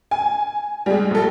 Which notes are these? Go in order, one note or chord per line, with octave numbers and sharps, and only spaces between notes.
G#5
G3 G#3
A#1 A4